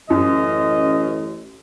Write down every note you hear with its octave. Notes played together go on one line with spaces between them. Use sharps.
A1 F#2 D#5